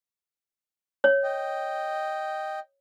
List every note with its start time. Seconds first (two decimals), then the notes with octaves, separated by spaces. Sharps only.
1.04 C#5
1.23 D#5 G5